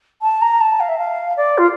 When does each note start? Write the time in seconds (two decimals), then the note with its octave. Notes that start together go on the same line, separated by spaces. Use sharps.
0.22 A5
0.41 A#5
0.61 A5
0.80 F5
0.88 E5
0.98 F5
1.37 D5
1.58 F4